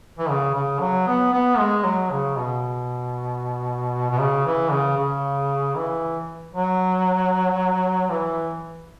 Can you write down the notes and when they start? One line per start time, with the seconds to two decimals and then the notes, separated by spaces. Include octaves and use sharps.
0.19 E3
0.29 C#3
0.55 C#3
0.80 F#3
1.07 B3
1.33 B3
1.58 G#3
1.84 F#3
2.11 C#3
2.36 B2
4.11 B2
4.19 C#3
4.46 E3
4.71 C#3
4.97 C#3
5.76 E3
6.54 F#3
8.10 E3